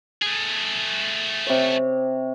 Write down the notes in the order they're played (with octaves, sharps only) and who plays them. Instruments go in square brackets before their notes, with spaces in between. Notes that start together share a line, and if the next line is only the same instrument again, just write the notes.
[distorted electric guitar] A3 G#4
[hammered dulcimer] C3 C#5